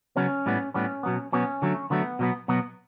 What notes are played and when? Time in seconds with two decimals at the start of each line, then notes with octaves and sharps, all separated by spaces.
0.16 C#3 F#3 B3 C#4
0.46 A2 G3 B3
0.74 A2 G3 B3 C#4
1.03 B2 F#3 B3
1.32 B2 F#3 B3 C#4
1.62 D3 F#3 A3
1.90 D3 F#3 A3 B3
2.19 B2 F#3 B3
2.48 B2 F#3 B3